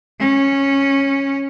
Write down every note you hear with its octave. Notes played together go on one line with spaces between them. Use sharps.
C#4